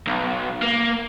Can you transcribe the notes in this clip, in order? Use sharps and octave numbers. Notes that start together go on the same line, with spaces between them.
B1
A#3